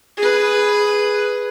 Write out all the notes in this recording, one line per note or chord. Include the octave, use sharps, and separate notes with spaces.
G#4 B4